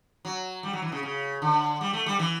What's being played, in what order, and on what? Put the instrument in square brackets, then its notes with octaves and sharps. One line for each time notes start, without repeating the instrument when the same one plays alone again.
[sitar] F#3
G3
F#3
E3
C#3
C#3
D3
G3
A3
G3
E3